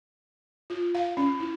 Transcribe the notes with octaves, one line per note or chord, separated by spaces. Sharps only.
F4
F5
C#4
E4